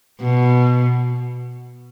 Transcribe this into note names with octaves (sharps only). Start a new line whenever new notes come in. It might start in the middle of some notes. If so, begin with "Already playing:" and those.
B2